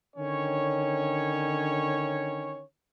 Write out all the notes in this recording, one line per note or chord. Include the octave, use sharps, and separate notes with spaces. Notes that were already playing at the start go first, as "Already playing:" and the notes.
D3 D#3 C#4 C#5